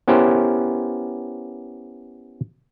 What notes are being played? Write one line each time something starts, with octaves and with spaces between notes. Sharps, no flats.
B3 C#4 E4 G4 A#4 C5